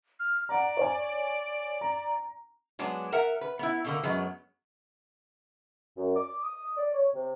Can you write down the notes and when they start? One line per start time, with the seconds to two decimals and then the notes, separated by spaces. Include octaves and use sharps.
0.20 F6
0.49 D5 F#5 A#5
0.77 C#5 G#5
1.81 A#5
2.79 F#3 G#3 B3 D4
3.12 A#4 E5 F#5
3.41 B4
3.59 B3 E4
3.84 B2 D3 A#3
4.03 F#2 F#3 G#3 B3
5.97 F#2
6.16 D6
6.42 D#6
6.77 D5
6.93 C#5
7.14 C3